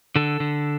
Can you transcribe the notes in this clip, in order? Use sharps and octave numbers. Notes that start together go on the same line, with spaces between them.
D3 A4
D3